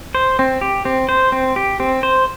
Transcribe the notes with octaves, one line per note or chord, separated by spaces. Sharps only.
C5
C4
G4
C4
C5
C4
G4
C4
C5